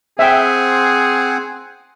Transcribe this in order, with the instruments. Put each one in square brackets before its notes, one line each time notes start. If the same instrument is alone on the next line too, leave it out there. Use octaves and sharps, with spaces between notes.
[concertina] C4 C5 F#5 [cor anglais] G#4 [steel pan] E5 G5